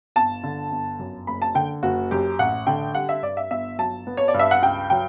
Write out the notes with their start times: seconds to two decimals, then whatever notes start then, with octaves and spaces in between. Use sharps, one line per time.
0.16 G1 A5
0.43 D3
0.72 G1
0.99 F#2
1.27 F#1 B5
1.42 A5
1.55 D3 G5
1.83 F#1 F#4
2.11 F#2 G4
2.39 A1 F#5
2.67 D3 G5
2.94 G3 F#5
3.09 E5
3.22 G2 D5
3.37 E5
3.50 G1 E5
3.79 F#3 A5
4.07 B3
4.17 C#5
4.28 D5
4.34 G2
4.39 E5
4.51 F#5
4.62 C#2 G5
4.90 F#3 G5